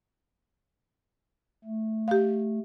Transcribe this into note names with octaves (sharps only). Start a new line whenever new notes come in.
A3
G4 F5